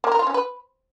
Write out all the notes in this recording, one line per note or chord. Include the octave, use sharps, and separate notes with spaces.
A#3
A#4
F4
C#4
B4